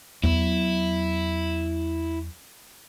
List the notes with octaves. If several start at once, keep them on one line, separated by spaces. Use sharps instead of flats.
E2 F#3 E4